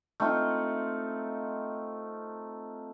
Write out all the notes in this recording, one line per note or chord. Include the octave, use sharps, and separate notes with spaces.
A3 C4 D#4 F4